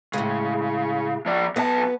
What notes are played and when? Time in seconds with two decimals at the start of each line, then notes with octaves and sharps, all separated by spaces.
0.13 A2 C#3 G#3
1.26 F3 D5
1.56 B1 B3 B4 A5